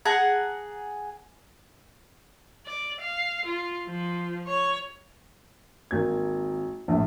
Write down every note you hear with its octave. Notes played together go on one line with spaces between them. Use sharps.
G#4 F#5 A5 A#5
D5
F5
F4
F3
C#5
G#1 A#3 G#6
A#1 A2